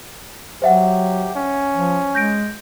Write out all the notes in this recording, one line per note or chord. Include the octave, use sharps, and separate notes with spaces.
F#3 G4 C5 E5 F#5
C#4
F3
G#3 G6 A#6 D7